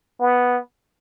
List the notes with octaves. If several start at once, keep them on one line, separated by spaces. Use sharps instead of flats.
B3